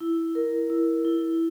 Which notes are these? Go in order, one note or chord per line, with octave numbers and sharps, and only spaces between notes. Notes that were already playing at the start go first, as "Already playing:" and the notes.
E4
A#4
E4
E4